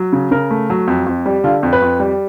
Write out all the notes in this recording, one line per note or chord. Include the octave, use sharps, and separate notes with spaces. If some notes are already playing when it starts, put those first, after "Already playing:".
Already playing: F#3
C#3
C#3 A#4
A3
F#3
F2
F2
G3
D3 F4
F2
B4
F2
G3